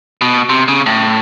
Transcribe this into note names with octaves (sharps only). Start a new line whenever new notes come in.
B2
C3
C#3
A2